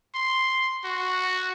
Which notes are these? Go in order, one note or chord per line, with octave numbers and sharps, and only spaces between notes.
C6
F#4